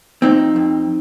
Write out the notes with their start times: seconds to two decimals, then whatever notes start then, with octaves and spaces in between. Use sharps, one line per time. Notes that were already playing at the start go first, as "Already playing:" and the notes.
0.22 F2 C4 D#4
0.56 F2